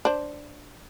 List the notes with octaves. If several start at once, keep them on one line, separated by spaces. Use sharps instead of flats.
D4 C5